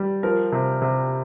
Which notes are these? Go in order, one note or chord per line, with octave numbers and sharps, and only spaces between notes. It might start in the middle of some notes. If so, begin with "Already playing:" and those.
Already playing: G3
F3 A#4
C3
C3